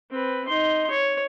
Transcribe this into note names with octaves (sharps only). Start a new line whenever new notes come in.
C4 B4
D#4 C6
C#5